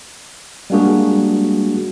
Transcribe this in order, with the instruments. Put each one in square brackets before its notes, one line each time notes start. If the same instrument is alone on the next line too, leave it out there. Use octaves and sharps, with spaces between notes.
[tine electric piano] G3 G#3 A#3 D4 F#4 G#4